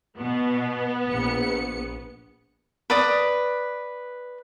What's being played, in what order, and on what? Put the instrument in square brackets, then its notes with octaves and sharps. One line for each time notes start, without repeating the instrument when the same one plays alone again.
[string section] B2 [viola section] B3
[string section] A#1 C#7
[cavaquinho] B4 D5 D#6